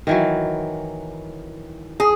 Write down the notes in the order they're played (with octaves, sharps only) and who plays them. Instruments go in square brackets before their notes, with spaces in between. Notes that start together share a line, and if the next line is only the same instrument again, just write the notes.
[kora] D#3 E3 F#3
[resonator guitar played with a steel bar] G#4